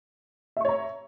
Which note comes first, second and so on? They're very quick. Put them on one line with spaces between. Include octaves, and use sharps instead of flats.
E5 C#6 C#5 A#5